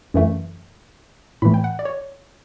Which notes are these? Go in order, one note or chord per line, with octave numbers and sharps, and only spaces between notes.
F#2 E3 A3
A2 E3 A3 B5
G5
F#5
D5
C#5